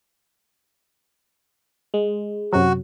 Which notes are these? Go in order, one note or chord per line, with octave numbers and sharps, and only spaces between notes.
G#3
F#2 C3 F#3 F#4